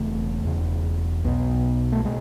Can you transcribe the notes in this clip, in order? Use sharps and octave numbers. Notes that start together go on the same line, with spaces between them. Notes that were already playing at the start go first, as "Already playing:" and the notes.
Already playing: E1 E2 C#3 A3
E1 E2 C#3
B1 B2 B3
A3
B2 G#3